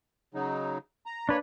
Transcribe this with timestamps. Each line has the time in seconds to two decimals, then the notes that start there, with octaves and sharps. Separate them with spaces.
0.34 C#3 F#3 D#4
1.06 A#5
1.29 A#3 D4 B4 C#5